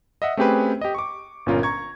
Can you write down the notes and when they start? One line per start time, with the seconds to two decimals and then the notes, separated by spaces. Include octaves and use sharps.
0.22 D#5 E5 F#5
0.37 A3 C4 C#4 G4 G#4 B4
0.81 G4 D#5
0.94 C#6 D6
1.46 G1 A#2 C#4 F4 A#4
1.63 A#5 C#6 G#6